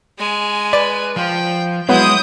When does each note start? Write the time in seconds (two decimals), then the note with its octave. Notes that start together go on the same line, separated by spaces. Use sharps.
0.19 G#3 G#5
0.73 B4 D5 A6
1.16 F3 F4 G5
1.89 F#3 G#3 B3 E4 D#6 G6